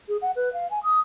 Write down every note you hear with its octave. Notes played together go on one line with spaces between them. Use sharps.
G#4
F#5
B4
F5
G#5
D#6